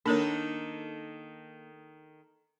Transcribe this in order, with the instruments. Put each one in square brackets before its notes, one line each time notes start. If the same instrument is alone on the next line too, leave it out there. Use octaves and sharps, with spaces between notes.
[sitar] D#3 D#4 A4 [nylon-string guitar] A#3 [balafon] D4 A#4 C#5